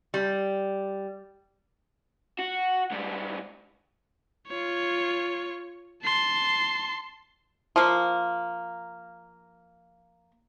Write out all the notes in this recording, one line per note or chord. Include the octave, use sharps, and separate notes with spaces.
G3
F#4
G#2 G3
F4 C#5
A5 C6
F3 A#3